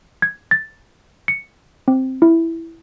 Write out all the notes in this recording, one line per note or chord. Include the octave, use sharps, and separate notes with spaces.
G#6
A6
C#7
C4
E4